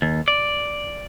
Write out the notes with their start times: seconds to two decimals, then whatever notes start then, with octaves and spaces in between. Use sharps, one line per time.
0.02 D#2
0.28 D5